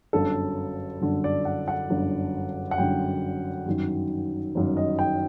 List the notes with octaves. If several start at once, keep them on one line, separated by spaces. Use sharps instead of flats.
G1 F#2 D3 A4
G1 F#2 D3
D5
F#5
F#5
G1 F#2 D3
F#5
G1 F#2 D3 G5
G1 F#2 D#3
G1 F#2 D#3
D#5
G5